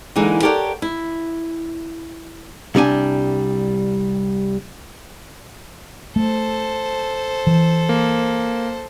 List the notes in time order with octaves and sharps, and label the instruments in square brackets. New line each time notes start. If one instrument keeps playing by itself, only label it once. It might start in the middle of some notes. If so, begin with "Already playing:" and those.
[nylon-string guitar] D3 E3 G#3 A#3 D#4
G4 A4 A#4 C#5 D5 F#5
E4
[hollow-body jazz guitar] C2 G3 D4 G#5
[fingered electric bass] A3 [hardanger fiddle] A4 C5
[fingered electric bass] E3
[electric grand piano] A#3